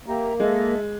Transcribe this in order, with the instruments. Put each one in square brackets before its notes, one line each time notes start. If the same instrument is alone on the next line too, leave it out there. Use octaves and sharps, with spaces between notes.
[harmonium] A#3 [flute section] G4 E5 A#5
[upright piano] G#3 [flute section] A4 D#5 E5